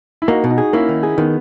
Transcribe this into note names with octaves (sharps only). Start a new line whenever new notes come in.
E4
A#3 D#4 F#4
B2
D#4 F#4
G#4
A#3 C#4 E4
D#3
G#4
D#3 B3